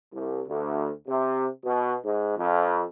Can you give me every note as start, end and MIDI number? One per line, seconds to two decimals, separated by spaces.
0.13 0.41 36
0.46 0.89 38
1.08 1.45 48
1.64 1.94 47
2.04 2.36 44
2.37 2.83 41